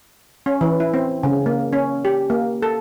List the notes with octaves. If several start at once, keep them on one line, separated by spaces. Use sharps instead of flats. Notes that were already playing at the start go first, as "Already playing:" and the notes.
C#4
E3
E4
C4
C#3
A#3
C#4
G4
A#3
A4